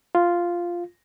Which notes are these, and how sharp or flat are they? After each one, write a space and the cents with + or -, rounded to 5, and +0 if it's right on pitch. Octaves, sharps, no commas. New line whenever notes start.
F4 -5